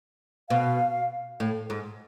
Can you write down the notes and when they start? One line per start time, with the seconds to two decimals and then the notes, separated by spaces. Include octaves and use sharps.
0.50 B2 F5
1.40 A2
1.70 G#2